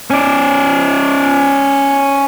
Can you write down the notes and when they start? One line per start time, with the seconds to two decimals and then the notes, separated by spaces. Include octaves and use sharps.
0.10 C#4 D5